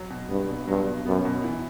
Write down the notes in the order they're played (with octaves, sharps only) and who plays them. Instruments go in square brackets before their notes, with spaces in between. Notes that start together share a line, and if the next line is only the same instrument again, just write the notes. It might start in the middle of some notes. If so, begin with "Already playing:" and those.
Already playing: [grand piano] F#3
B2
[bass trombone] G2 [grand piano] B3
[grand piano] B2
[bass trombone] G2 [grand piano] F#3
[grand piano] B2
[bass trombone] F#2 [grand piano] B3
[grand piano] B2
E3